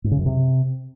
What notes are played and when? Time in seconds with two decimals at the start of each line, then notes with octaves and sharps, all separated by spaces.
0.04 G#2
0.11 C#3
0.19 F#2
0.26 C3